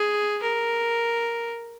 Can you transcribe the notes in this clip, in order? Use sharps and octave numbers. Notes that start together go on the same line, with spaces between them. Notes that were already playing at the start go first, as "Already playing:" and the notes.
Already playing: G#4
A#4